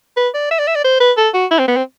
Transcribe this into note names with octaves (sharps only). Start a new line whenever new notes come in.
B4
D5
E5
D5
E5
D5
C5
B4
A4
F#4
E4
C4
B3
C4